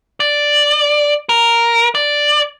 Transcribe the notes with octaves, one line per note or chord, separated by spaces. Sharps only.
D5
A#4
D5